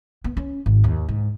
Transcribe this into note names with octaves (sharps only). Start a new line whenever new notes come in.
B3
C#4
G#1
D#2
G#2